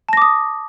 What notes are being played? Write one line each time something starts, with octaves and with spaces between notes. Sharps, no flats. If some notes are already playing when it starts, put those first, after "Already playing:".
A5 D6 D#6 A#6